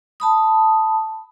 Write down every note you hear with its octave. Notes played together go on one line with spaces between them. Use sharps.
A5 B5 D#6